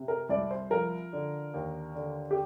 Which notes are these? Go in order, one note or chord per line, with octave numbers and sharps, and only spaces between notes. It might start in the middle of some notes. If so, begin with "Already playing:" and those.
Already playing: C3
A#4
C2 D5
C5
F3 A#4
D3
D#2
D3
G4